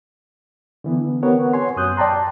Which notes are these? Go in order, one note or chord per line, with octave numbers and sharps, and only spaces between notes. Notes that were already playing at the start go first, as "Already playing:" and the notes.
D3 E3 B3
B3 C4 G4 A#4 C#5 F#5
C#5 G#5 C6
F#2 F#3 D#6 F#6 G6
D5 G5 A5 A#5 C6